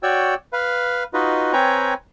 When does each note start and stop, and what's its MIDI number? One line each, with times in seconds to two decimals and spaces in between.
0.03 0.34 66
0.03 0.34 73
0.03 0.34 74
0.03 0.34 79
0.03 0.34 88
0.53 1.04 71
0.53 1.04 77
1.14 1.53 63
1.14 1.53 65
1.14 1.53 66
1.14 1.53 71
1.14 1.53 75
1.53 1.94 60
1.53 1.94 71
1.53 1.94 73
1.53 1.94 79
1.53 1.94 80
1.53 1.94 82